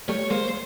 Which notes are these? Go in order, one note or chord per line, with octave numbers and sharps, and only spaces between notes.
G3 A3 C#5
G#3 A#3 C5